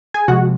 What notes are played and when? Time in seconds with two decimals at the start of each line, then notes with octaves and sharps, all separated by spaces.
0.14 G#4 G#5
0.28 C3 F3 G#3 F#4 F#5